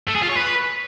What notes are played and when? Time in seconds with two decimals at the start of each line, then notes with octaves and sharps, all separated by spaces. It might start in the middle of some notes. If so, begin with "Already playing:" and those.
0.08 A3
0.16 G#4
0.23 F4
0.30 C#5
0.37 B4